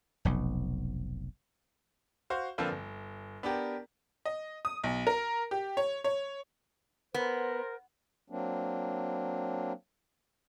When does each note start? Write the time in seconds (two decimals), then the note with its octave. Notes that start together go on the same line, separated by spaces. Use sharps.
0.25 F1 B1
2.30 F#4 C5 F5
2.58 D3 F3 A#3 C4 F4 B4
2.72 G1
3.43 B3 D4 G4 A#4
4.26 D#5
4.65 D#6
4.84 B1
5.07 A#4
5.51 G4
5.77 C#5
6.04 C#5
7.14 B3 A#4 C5
8.30 F#3 A#3 C4 D4